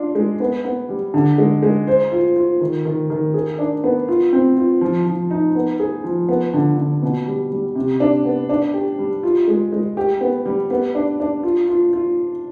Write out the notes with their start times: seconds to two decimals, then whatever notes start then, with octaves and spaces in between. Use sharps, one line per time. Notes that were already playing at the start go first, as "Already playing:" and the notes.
Already playing: D4 F4
0.15 G#3
0.40 B3
0.65 B3
0.89 G3
1.14 D3
1.38 G#3
1.63 G#3
1.87 C5
2.12 F4
2.36 F4
2.61 D#3
2.85 D#3
3.10 D#3
3.34 G#4
3.59 D4
3.84 B3
4.08 F4
4.33 C4
4.57 F4
4.81 F3
5.06 F3
5.31 D#4
5.55 B3
5.80 G#4
6.04 F3
6.29 B3
6.54 D3
6.78 D3
7.03 B2
7.27 G3
7.51 G3
7.75 C3
8.00 D4
8.25 B3
8.49 D4
8.74 G4
8.99 G3
9.23 F4
9.48 G#3
9.72 G#3
9.97 G4
10.21 B3
10.46 G3
10.70 B3
10.95 D4
11.20 D4
11.43 F4
11.68 F4
11.93 F4